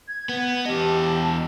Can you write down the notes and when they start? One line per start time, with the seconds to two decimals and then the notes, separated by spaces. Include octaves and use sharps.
0.07 G#6
0.29 B3
0.66 E2 G4 D#5 A5